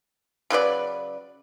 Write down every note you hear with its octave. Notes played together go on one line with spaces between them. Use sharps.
C#3 F#3 B4 D5